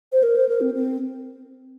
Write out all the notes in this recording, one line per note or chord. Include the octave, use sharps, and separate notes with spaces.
C5
A#4
C5
A#4
C4
C4